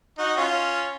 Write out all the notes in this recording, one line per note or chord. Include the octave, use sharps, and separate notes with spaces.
D#4 F#4
C#4 F4